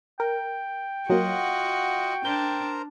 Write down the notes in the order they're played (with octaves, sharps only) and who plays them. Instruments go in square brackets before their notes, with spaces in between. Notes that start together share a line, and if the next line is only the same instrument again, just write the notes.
[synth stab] A#4 [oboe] G5
[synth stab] F#3 A#3 [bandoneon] F4 D#5 F#5 [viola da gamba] F#4
[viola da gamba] D4 [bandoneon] A#4 C5 A#5 [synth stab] G6